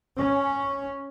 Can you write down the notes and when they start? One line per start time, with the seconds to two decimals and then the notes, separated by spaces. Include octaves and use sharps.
0.18 C#4